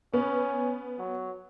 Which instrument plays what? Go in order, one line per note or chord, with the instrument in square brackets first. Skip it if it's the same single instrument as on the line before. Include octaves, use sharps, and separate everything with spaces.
[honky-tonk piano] B3 [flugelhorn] C#4
[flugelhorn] F#3